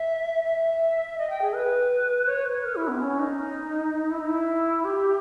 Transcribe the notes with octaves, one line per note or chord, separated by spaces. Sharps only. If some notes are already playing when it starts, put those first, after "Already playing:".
Already playing: E5
E5
D#5
G5
G#4
B4
C#5
B4
A#4
E4
B3
C#4
D#4
E4
D#4
E4
G4